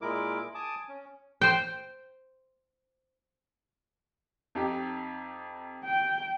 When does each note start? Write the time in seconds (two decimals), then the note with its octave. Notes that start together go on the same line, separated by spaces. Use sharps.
0.01 A#2 G#3 E4 A#4 D6
0.55 G#5 A5 D6 D#6
0.89 C#4
1.41 C5 G5
4.55 F2 D#4 G4
5.84 G5